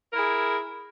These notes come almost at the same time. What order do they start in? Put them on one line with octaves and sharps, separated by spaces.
A#4 E4 G#4